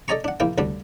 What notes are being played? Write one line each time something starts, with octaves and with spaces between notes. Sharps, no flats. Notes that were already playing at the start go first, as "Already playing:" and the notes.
A4 D5 D#5 G#5 A#5 C#6
D4 F#5
A#1 A#3 E4 G5
D2 D3 G3 D4